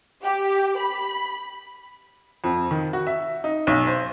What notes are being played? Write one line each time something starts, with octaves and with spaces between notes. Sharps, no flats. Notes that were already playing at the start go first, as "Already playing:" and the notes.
G4
B5
F2
D#3
F#4
E5
D#4
B1
C5